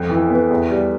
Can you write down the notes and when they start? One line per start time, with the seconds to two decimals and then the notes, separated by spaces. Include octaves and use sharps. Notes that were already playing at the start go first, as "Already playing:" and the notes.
Already playing: F2
0.10 E3
0.30 B3
0.50 E2
0.71 G3